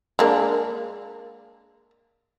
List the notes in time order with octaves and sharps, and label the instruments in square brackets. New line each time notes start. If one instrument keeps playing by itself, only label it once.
[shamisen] G#3 A#3 D4